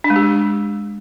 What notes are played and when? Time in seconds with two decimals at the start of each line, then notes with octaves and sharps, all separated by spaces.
0.04 D4
0.10 G#3
0.16 G4